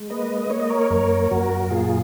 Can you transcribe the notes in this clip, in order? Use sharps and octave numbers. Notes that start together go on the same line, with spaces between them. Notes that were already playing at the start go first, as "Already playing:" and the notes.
Already playing: G#3
A#3 B4 D#5
A#3 C#5
D#5
A#4 C#5
F#2 A#4 C#5
F#2 F#4 A#4
A#2 F4 G#4